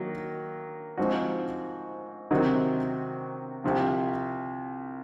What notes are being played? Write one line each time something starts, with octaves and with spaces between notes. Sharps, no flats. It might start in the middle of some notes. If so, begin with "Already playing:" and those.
Already playing: D#3 F#3 A#3
G#2 F3 C4 F#4
C3 D#3 F#3 C4 F#4
C2 C3 F3